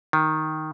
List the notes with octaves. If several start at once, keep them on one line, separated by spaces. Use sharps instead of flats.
D#3